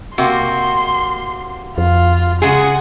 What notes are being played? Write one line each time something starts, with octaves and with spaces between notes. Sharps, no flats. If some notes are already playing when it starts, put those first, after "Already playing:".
C3 A#3 F#4 C6
F2 F4
C#3 G#3 G#4 F#5